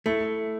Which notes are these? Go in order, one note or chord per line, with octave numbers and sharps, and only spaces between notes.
A3 E4